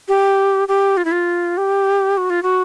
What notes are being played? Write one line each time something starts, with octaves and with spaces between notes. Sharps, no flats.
G4
G4
F4
E4
F4
G4
F#4
F4
F#4